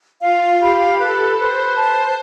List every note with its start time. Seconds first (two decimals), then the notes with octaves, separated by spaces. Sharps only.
0.20 F4 F5
0.59 G4 B5
0.99 A4 B4
1.37 B4 C5
1.76 C5 A5